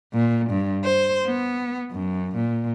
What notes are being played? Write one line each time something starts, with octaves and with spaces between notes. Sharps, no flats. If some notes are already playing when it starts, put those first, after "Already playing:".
A#2
G2
C5
B3
F#2
A#2